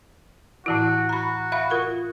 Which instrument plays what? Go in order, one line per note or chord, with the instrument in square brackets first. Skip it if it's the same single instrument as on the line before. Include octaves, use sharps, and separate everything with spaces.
[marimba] A2 E3 E4 [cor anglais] F#4
[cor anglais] F#4 [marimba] A#5 B5
[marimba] E5 F5 B5
F4 A#4 C#6